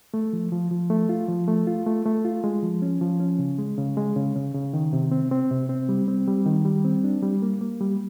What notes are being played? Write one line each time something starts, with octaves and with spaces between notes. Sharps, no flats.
A3
F3
F3
F3
A3
F4
F3
A3
F4
A3
A3
F4
G#3
F3
C#4
F3
C#4
C#3
G#3
C#3
G#3
C#3
C#3
C#3
D#3
C3
C4
C4
C3
C4
G3
C4
G3
D#3
G3
C4
D4
G3
A#3
A#3
G3